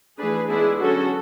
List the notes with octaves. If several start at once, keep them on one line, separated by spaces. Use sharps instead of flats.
E3 A3 D4 G#4 B4
G#3 B3 D4 E4 G#4
D3 F#3 C#4 F#4 A4